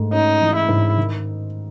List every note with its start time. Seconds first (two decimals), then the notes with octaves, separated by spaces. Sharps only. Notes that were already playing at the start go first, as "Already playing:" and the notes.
Already playing: G#2 A3
0.13 C#4 D#4
0.41 E3
0.56 E4
0.69 G#2
0.97 D#3